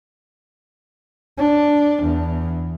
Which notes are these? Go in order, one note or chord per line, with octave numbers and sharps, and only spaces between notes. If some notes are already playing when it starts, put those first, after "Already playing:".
D4
E2